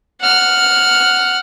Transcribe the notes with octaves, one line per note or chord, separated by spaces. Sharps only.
F#5 F6